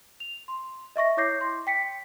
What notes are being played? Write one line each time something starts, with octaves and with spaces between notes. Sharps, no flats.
F7
C6
D#5 E5 C#6 A#6
E4 C#5 D6 G6 A#6 C7
C6
G5 B6 C#7